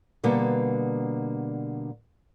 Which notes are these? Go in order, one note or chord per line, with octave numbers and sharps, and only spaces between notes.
B2 D3 G3 A#3 B3